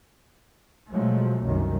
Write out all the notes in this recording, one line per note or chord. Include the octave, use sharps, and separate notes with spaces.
B2 F3 F#3 G#3 A3
G1 C2 F#2 D#3